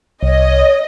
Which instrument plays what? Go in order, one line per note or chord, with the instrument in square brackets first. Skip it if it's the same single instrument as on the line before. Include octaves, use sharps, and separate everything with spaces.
[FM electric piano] C2 [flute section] C#5 [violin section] D#5